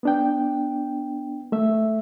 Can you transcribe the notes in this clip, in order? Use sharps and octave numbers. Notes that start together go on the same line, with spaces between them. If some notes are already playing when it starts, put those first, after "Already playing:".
B3 D4 G5
A3 E5